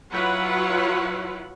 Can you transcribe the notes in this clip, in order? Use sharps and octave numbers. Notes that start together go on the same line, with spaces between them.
F#3 E4 F4 B4 C#5 F#5